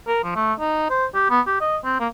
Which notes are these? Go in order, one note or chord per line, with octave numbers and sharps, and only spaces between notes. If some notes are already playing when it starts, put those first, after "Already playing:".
A#4
F3
A3
D#4
C5
G4
B3
G4
D#5
C4
A#3